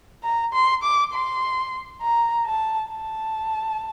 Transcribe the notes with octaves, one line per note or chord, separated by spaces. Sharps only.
A#5
C6
D6
C6
A#5
A5
A5